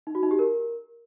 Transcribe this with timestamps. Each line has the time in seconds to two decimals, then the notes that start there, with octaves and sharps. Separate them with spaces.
0.07 D#4
0.15 F#4
0.23 D#4
0.31 G4
0.39 A#4